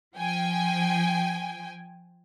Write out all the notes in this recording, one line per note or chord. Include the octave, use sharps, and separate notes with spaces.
F3 G5 G#5